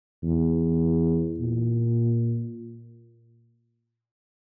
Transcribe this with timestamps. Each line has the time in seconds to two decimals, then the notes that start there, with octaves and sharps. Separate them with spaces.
0.23 E2
1.40 A#2